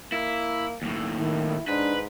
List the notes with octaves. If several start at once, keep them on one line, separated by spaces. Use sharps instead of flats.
A#3 E4
D#2 A2
D#3 E4
G#2 D4 B4